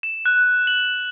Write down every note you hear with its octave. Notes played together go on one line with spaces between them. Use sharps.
E7
F#6
F#7